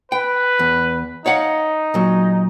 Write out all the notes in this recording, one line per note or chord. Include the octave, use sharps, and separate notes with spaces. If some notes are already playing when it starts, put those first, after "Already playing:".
B4 G5
E2
D#4 C#5 F5 F#5
A#2 F#3